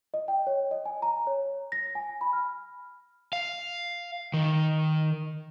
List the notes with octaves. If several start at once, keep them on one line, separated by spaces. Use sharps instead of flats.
D#5
G5
C#5
D#5
G#5
A#5
C#5
A#6
G#5
B5
F6
F5
D#3